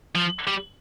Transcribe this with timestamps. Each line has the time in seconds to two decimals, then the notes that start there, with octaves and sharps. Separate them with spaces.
0.15 F3
0.47 G3